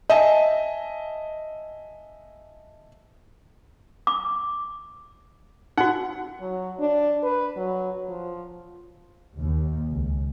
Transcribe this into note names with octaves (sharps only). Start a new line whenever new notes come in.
D#5 E5 G#5 A5
D6
D#4 F#4 F#5
F#3
D4
B4
F#3
F3
D#2
C#2